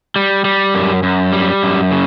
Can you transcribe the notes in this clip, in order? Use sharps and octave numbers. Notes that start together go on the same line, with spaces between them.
G3
G3
F#2
F#2
G3
F#2
C#3